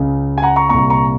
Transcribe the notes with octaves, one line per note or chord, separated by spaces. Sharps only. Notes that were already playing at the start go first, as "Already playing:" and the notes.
Already playing: C#2 C#3
G#5
F#5 A#5
A#5 C#6
C2 A#2 A#5 C#6
A#5 C#6